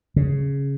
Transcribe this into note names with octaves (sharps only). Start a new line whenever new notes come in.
C#3